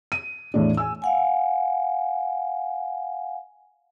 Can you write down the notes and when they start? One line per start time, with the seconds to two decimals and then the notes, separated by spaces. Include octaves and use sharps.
0.12 D#7
0.54 E2 A2 D4
0.77 G#5 E6
1.02 F5 F#5 G#5